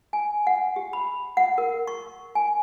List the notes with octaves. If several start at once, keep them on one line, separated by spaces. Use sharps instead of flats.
G#5
F#5
G4
B5
F#5
A#4
C#6
G#5